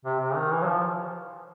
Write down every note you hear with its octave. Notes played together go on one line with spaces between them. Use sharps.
C3
C3
D#3
E3
F#3
F3